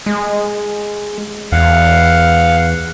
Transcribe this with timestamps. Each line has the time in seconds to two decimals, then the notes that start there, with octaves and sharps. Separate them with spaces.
0.06 G#3
1.52 E2 F5 F#5